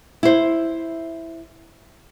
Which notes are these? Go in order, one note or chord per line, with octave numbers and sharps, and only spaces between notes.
E4 C5